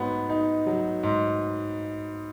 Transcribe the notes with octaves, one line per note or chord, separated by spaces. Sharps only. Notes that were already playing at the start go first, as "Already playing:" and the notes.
Already playing: G#2 F#3 B3
D#4
F#3
G#2